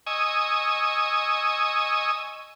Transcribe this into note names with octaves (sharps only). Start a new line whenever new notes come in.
D#5 G#5 C#6 D#6 E6